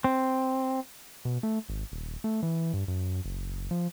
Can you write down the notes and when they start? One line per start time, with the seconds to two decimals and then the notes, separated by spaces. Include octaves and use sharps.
0.04 C4
1.25 B2
1.43 A3
1.69 G#1
1.92 D#1
2.24 A3
2.43 E3
2.73 G2
2.88 F#2
3.24 F#1
3.71 F3